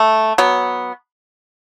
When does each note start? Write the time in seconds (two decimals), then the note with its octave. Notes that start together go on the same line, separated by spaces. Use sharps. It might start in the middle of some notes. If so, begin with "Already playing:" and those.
Already playing: A3
0.38 F#3 B3